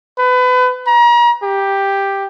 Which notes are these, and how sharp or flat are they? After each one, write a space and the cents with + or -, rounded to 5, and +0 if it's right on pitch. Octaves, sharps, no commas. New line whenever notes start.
B4 +30
A#5 +35
G4 +5